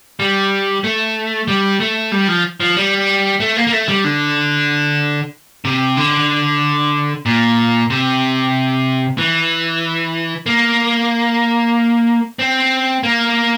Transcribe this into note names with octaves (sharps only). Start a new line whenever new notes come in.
G3
A3
G3
A3
G3
F3
F3
G3
A3
A#3
A#3
A3
G3
D3
C3
D3
A#2
C3
E3
A#3
C4
A#3